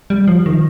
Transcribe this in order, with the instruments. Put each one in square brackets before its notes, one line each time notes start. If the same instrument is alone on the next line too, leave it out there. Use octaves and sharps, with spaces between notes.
[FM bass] G3
F3
D#3